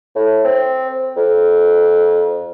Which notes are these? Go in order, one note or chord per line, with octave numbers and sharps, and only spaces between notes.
A2
C4
F2